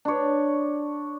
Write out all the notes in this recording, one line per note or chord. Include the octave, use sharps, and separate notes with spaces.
D4 C#5